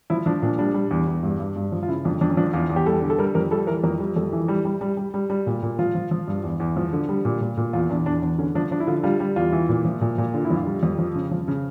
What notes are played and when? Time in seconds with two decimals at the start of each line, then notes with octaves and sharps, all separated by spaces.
0.10 F3 E4
0.26 F3 D4
0.42 A#2 D4
0.58 G3 D4
0.74 G3
0.91 E2
1.07 E2
1.23 G2
1.39 G2
1.56 G2
1.72 F3
1.83 F4
1.88 C#3 E4
2.05 F2 D4
2.21 F2 D4
2.30 C#4
2.37 F3 D4
2.54 E2 F4
2.70 E2
2.76 G4
2.86 G3 A4
3.02 D3
3.10 A4
3.18 G3 A#4
3.35 F2 A#4
3.51 G3 A4
3.67 E3 A#4
3.84 F2 A#4
4.00 G3
4.16 F2 A4
4.33 E3
4.48 G3
4.65 G3
4.81 G3
4.97 G3
5.14 G3
5.30 G3
5.47 A#2
5.63 A#2
5.79 F3 F4
5.95 F3
6.11 F3
6.28 G2
6.44 E2
6.60 E2
6.77 F3
6.93 D3
7.09 G3
7.25 A#2
7.41 A#2
7.57 A#2
7.73 E2 F4
7.90 E2 D4
8.06 E2 D4
8.22 E2 D4
8.38 D3 C#4
8.55 F3 D4
8.71 F3 D4
8.80 E4
8.87 D3 F4
9.04 G3 F4
9.20 G3
9.36 E2 F4
9.52 E3
9.69 A#2
9.85 F3
10.01 A#2
10.18 A#2
10.34 D3 F4
10.45 E4
10.50 F2
10.56 F4
10.67 G3
10.83 F2
10.99 F3
11.15 C#3
11.31 F3
11.48 C#3